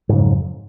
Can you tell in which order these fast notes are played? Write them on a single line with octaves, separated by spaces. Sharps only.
G#2 C#3 F#3 F2